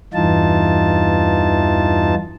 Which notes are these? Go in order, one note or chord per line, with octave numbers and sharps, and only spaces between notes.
E2 G2 E3 D#4 F4 A5